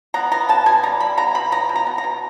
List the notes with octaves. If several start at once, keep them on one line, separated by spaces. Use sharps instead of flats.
B3 A#5
B3 A#5
B2 A5
B2 G#5
G3 A#5
G3 B5
B3 A#5
B2 B5
B3 A#5
B2
A#5
B3
A#5
B2